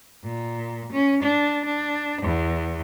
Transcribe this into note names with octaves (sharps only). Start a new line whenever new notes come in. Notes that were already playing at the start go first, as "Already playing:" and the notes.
A#2
C#4
D4
D4
E2